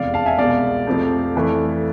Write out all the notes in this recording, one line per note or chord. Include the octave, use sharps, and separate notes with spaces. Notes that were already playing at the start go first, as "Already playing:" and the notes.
Already playing: F1 E2 C3 G#3 D5 F5
F5 A5
E5 G#5
C2 B2 G#3 D5 F5
F2 C3 F3 A3
F2 E3 A3